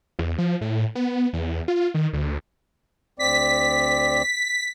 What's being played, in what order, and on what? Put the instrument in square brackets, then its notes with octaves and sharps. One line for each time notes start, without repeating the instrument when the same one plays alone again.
[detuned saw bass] E2
F3
A2
B3
E2
F4
D#3
D2
[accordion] D2 C4 D5 [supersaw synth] B6